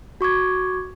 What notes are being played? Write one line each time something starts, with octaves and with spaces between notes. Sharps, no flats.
F#4 C#6 D6 G#6